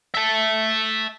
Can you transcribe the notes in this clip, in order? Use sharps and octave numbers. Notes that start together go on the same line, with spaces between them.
E5 A5